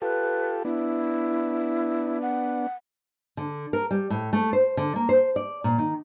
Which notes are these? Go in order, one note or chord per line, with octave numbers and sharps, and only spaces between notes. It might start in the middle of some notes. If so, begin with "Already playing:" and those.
F4 G4 A4 B4
B3 D4 E4
F#5
D3
A#4
G3
A2
A3
C5
D3
A#3
C5
D5
A#2
D#3